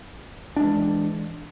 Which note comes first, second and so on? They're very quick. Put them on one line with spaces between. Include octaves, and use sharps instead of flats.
D4 G#3 E3